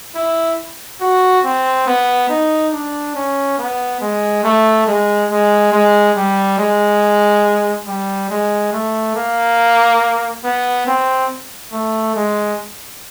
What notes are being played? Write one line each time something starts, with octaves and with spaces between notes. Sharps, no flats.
E4
F#4
C4
B3
D#4
D4
C#4
B3
G#3
A3
G#3
G#3
G#3
G3
G#3
G3
G#3
A3
A#3
B3
C4
A3
G#3